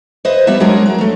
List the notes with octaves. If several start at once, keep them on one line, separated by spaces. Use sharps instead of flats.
B4 C5 D#5 E5
G3 B3 E4 E5
F#3 G#3 D4 F#4 G#4 A#4
A#4
F#3 A3